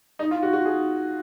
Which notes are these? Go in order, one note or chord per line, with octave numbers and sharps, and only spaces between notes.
D#4
F4
F#4
F#4
G#4